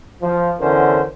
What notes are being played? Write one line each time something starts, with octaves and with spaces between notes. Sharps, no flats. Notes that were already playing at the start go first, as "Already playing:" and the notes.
F3
E2 D3 C#4 A#4 C5